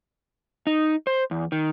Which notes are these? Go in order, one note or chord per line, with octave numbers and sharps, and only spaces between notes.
D#4
C5
E2
D#3